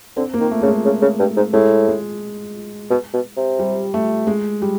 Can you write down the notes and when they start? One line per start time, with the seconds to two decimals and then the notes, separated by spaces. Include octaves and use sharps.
0.17 D3 C4
0.34 A#3
0.40 D#3
0.51 A3
0.61 C#3 A3
0.68 G#3
0.85 C#3
1.02 C#3
1.19 G2
1.36 G#2
1.53 A2 G#3
1.88 G#3
2.90 B2
3.13 B2
3.37 C3
3.59 G3
3.94 A3
4.27 G#3
4.62 G3